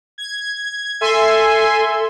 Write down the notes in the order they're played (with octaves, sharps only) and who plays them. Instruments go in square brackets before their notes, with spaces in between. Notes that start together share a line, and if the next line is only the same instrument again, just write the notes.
[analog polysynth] G#6
[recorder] A4 [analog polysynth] E5 G#5 C6